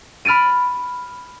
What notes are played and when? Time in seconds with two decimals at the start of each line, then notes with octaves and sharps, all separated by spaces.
0.25 B5 F6 A6 D7 D#7